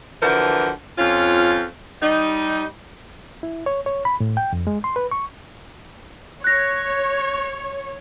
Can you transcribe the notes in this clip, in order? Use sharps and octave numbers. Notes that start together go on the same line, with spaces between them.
D3 E3 F3 F#4 A#4
F2 C#4 F4
G3 D#4
E4
C#5
C#5
B5
A2
G5
F2
G#3
C6
B4
C#6
C#5 F#6 A#6